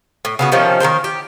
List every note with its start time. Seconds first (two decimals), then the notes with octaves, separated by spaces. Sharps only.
0.25 A2
0.39 C#3 B3 F#4
0.52 C3 D#3 F3 C#4
0.80 D#3 G3 A#4 C5
1.04 G4